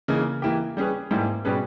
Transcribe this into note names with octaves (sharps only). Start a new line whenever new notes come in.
C#3 E3 A#3 D#4
E3 A#3 E4 G4
G3 C#4 G#4 B4
G#2 G3 A#3 E4
B2 G3 C#4 G#4 B4